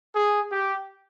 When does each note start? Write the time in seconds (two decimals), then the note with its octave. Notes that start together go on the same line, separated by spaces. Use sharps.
0.15 G#4
0.51 G4